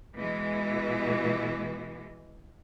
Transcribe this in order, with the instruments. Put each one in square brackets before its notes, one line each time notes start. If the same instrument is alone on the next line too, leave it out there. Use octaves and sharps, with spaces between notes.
[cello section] B2 E3 G#3